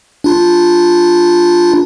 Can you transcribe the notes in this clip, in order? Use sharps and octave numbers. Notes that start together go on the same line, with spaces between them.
D4 F4